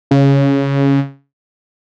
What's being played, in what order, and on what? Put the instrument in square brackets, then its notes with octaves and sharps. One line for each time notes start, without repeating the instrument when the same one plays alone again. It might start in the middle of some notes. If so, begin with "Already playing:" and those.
[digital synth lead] C#3